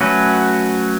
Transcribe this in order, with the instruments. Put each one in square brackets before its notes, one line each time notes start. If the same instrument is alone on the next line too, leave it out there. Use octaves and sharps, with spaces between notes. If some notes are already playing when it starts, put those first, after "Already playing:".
[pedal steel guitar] F#3 A3 C#4 F#4 B4